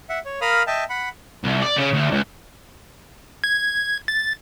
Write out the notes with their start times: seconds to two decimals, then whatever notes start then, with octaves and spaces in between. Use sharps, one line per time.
0.09 E5 F#5
0.25 C#5
0.41 A#4 F5 B5 D#6 F6
0.67 D#5 E5 G5 A5
0.89 F#5 B5
1.44 C2
1.62 D5
1.77 C#3
1.93 D2
2.11 C#2
3.44 G#6
4.08 A6